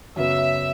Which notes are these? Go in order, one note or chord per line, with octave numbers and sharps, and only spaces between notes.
F#2 C#3 F#3 B3 E5